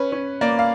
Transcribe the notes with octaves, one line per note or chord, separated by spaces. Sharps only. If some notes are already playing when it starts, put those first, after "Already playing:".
Already playing: C#4 B4
C#4
A#3 D5
F5